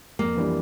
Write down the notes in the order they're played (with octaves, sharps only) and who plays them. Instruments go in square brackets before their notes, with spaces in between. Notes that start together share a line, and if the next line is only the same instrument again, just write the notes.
[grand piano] F2 [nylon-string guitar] A#3
[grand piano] E3 G3 D4 G4